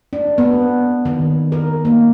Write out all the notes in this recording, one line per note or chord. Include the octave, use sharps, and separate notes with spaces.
D4
B3
D#3
A#4
A#3